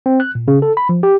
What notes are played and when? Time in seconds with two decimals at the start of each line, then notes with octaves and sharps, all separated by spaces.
0.06 C4
0.20 F#6
0.35 A#2
0.48 C#3
0.62 A4
0.77 B5
0.89 F3
1.03 G4